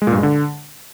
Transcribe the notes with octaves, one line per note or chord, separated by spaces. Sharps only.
G#3
A#2
G2
G#3
D3